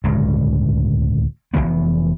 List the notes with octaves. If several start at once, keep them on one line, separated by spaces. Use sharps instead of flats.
D1 C#2 G2
F1 F#2 E3 B3